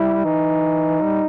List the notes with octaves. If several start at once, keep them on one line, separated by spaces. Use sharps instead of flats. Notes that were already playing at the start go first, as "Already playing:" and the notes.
Already playing: G3 E4
E3 D#4
G3